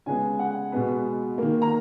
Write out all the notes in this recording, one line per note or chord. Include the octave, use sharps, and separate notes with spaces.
C#3 G#3 B3 G#5
F#5
B2 G#3 B3
D#3 A#3
A#5